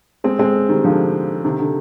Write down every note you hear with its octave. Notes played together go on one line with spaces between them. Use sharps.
G#3 C4
G#3 C4
D#3 G3
D3 F3
C3 D#3
D3